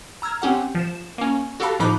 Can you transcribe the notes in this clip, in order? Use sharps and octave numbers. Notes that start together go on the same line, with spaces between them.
A#5 E6 F6 G#6
C4 C#4 G4 F#5
F3 E7
A#3 C#4
F#4 G4 A4 F5 A5 B5
A2 F3 D#4 B5 D6 F#6